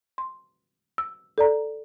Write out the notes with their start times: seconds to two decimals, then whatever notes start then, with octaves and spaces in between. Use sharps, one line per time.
0.18 C6
0.98 E6
1.38 A4 D5 A#5